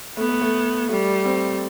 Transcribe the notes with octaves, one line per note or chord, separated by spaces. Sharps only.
A3 B3
A3
A3
G3 A3
C4